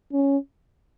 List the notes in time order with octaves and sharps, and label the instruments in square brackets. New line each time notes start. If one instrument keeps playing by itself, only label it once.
[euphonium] C#4